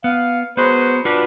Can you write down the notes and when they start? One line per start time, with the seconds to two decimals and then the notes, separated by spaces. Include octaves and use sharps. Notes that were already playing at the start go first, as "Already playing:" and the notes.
0.04 B3 F5
0.57 F#3 G#3 B3 B4 C5
1.05 D4 F4 F#4 B4